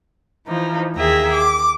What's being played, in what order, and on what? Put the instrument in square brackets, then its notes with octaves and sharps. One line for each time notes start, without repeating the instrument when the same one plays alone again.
[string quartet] E3 F3 D#4
D#2 G#4 E5 G5 A#5
D6